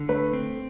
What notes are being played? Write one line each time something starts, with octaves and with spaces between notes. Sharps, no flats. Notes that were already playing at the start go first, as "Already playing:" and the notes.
Already playing: D3
A3 B4
C4